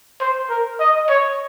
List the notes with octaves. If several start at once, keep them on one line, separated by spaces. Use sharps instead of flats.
C5
A#4
D#5
C#5